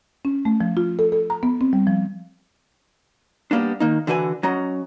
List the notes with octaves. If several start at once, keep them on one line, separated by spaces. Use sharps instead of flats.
C#4
A3
F3
F4
A4
A4
A#5
B3
C4
G3
F3
G3 A#3 B3 D4
D#3 A#3 D#4
D3 E3 F#4 B4 G5 G#5
F#3 C#4 D#5 F#5 A#5